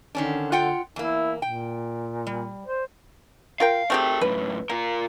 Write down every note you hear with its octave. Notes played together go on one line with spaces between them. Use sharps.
D3 D#3 C#4 D4
F4 F#5 G5
E2 A#3 E4
A#2 G5
G3
C5
F4 A#4 F5 G5
A3 C4 G4 G#4 A#4
F#2 A2 B4
A#3 F4 A#4